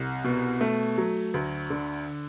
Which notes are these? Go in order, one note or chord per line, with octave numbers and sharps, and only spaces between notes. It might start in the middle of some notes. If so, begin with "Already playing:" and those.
Already playing: C2
B2
A3
F#3
D2
D3